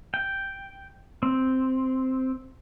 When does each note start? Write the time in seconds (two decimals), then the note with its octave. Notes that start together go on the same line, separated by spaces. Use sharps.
0.14 G5
1.23 C4